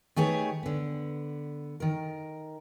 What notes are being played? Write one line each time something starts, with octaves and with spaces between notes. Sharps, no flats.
D#3 A3 G4 G#4 B4 C#5
D3 B3
D#3 A#4